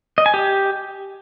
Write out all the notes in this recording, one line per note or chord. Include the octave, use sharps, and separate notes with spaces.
D#5
G#5
G4